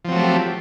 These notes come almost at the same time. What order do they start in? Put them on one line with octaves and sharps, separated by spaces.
F3 C4 F#3 A3 G4